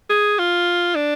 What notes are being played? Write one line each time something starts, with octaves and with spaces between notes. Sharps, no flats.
G#4
F4
D4